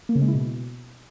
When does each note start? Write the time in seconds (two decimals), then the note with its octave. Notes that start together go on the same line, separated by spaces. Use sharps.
0.09 A#3
0.15 C#3
0.22 G#3
0.28 E4
0.35 B2